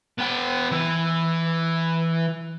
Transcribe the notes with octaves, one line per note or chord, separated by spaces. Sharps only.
B3 G5
E3